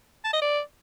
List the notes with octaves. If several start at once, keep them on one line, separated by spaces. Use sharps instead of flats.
A5
D#5
D5